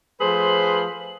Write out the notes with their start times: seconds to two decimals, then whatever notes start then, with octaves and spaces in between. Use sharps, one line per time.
0.21 F3 A3 G#4 B4 C5